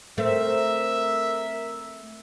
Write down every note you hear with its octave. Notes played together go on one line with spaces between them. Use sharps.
A3 C4 A#4 E5